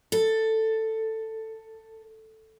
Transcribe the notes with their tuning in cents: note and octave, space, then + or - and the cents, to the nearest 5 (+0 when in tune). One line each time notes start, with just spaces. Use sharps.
A4 +10